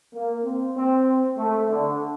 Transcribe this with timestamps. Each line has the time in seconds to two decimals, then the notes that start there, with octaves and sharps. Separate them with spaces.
0.12 A#3
0.43 C4
0.75 C4
1.38 A3
1.69 D3